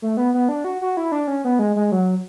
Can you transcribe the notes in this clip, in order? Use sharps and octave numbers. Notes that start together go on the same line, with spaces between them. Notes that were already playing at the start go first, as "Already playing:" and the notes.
A3
B3
B3
D4
F#4
F#4
E4
D4
C#4
B3
G#3
G#3
F#3